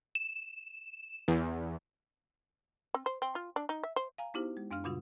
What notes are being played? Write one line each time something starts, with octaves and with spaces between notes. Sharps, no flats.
E7
E2
C4
C5
C4
F4
D4
D#4
E5
C5
F5 G#5 A#5
B3 D#4 E4 F#4 G4 C5
G#3
F#2 D4 F5 F6
A#2 C#3 G3 F4 F#4